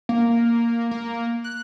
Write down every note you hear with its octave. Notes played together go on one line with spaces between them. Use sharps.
A#3
A#3
F#6